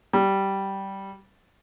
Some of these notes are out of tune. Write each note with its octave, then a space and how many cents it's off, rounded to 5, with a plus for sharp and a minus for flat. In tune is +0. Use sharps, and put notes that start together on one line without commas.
G3 -10